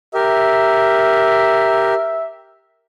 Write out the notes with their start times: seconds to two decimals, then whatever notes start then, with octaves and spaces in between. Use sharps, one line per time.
0.14 G4 A#4 E5